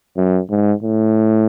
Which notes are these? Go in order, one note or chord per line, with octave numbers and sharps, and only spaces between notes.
F#2
G#2
A2